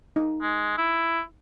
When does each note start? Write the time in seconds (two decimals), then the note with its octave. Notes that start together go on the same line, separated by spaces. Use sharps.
0.16 D#4
0.42 G#3
0.77 E4